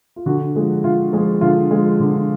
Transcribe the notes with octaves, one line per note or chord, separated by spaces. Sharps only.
F4
D3 F#4
F3 G#3
D3 F4
F3 G#3
D3 F4
F3 G#3
D3